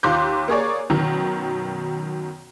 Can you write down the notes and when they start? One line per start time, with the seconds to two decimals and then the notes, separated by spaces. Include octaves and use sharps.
0.03 D#2 F4 C6 D6 F#6 G6
0.48 A#3 G#4 C#5 D5
0.90 F#2 B2 D#3